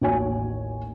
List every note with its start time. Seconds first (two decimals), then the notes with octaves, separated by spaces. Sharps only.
0.01 A1 D#2 F#4 C#5 G#5